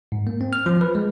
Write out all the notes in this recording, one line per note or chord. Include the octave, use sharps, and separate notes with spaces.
G#2
A#3
C4
F6
F3
B4
G#3